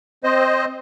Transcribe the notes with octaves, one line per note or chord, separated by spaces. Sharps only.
C4 C5 D#5